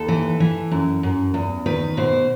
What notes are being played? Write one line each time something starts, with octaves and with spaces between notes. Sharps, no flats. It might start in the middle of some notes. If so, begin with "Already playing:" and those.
Already playing: D#2 A4
E3
E3
F#2
F#2
E2
D#3 B4
B2 C5